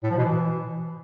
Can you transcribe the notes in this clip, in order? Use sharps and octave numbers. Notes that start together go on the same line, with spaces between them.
A2
F3
B2
E3